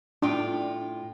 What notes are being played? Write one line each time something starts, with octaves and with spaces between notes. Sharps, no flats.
A2 D4 F4 G5